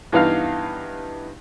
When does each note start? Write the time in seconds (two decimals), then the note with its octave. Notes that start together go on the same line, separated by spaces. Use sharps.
0.12 G2 E3 B3 D#4 F5 F6